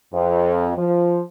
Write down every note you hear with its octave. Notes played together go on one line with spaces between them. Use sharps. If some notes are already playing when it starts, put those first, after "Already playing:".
F2
F3